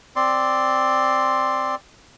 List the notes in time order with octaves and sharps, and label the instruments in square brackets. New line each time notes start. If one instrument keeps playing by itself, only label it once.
[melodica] C4 D5 C6